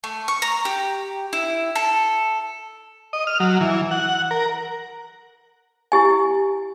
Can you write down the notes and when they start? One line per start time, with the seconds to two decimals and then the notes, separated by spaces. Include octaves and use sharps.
0.04 A3
0.28 C#6
0.42 A#5
0.65 G4
1.33 E4
1.75 A4
3.13 D#5
3.27 F6
3.40 F#3
3.61 E3
3.91 F#5
4.31 A#4
5.92 E4 G4 G#5